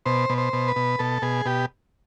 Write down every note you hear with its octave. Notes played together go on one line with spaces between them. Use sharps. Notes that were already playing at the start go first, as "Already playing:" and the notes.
B2 C5
B2
C5
B2
B4
B2
B2 A4
B2 G#4
B2 G4